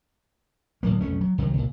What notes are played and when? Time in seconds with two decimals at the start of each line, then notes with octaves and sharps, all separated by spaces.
0.83 D1 A2 F#3 A#3
1.01 B1 F2 A3 C#4
1.21 F#3
1.38 C2 C3 D#3 F#3
1.54 C2 A#2